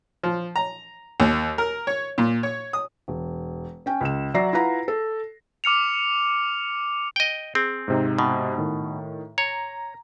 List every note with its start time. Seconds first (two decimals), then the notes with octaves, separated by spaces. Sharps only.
0.24 F3
0.56 A#5
1.20 D#2
1.58 A#4
1.87 C#5
2.18 A#2
2.43 C#5
2.73 D#6
3.08 E1
3.86 C#4 G5
4.01 C#2 E7
4.34 F#3 D5 E5 A#5 A#6 C7
4.53 E4 F4 B4 F#5 A#5
4.88 A4
5.64 D6 F6 C#7 F7
7.16 D#5 G5
7.55 C4 G#4
7.88 G#2 C3 D#4
8.18 B2
8.58 A2 D#3
9.38 C#5 A#5